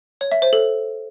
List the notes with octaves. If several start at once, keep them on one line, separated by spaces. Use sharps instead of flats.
C#5
E5
C5
A4